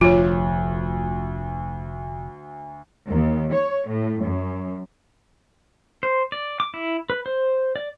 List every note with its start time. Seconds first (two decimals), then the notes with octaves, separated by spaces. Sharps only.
0.01 F1 D2 F3 F4 C#5
3.07 D#2
3.52 C#5
3.88 A2
4.21 F#2
6.03 C5
6.32 D5
6.60 D6
6.74 E4
7.10 B4
7.26 C5
7.76 D5